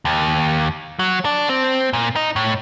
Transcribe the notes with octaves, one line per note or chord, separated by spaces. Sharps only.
D#2
F#3
D4
C4
A#2
D#4
A2